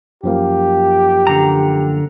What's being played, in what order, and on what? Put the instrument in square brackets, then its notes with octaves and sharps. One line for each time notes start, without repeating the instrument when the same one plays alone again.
[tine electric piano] F#2 F3 A#3 [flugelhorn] G4
[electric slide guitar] D3 A#5